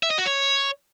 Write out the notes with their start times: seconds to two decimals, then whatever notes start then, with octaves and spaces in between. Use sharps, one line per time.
0.03 E5
0.10 D#5
0.18 F#4
0.26 C#5